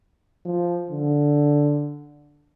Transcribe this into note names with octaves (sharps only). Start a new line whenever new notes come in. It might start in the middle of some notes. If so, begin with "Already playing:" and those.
F3
D3